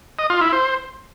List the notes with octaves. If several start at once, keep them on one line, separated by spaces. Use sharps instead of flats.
D#5
F4
E4
C5